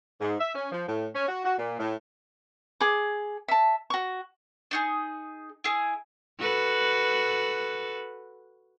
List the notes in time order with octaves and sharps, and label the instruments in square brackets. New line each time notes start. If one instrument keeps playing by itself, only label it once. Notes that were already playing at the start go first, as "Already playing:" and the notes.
[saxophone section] G#2
E5
C#4
F3
A2
C#4
F#4
F#4
A#2
A2
[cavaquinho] G#4 D6
E5 A5
F#4 C#6
[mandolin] D4 D#4 G#4
E4 G#4
[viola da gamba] F#4 A4 B4